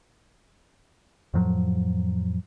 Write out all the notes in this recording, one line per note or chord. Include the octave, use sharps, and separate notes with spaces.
F2 A2 F3 F#3